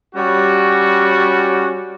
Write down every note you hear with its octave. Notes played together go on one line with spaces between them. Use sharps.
G3 C#4 F#4